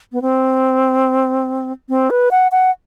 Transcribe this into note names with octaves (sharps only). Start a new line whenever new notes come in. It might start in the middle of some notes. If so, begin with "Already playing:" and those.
B3
C4
C4
B4
F#5
F#5